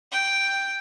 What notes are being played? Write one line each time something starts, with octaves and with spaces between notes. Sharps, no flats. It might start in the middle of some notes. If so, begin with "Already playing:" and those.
G5